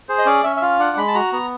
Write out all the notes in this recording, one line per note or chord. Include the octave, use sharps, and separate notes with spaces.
G#4 C5
D#5
C#4 D5
C#4 E5
E5
F4 F5
D4 F#5
G#3 B5
A5
F#4 A#5
B3 A#5